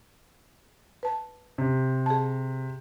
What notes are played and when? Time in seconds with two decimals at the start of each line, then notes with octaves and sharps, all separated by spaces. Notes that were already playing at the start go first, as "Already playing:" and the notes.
1.03 B4 A5
1.58 C3
2.06 G#4 A5